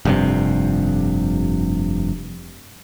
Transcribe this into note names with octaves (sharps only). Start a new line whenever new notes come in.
F1 G2 C3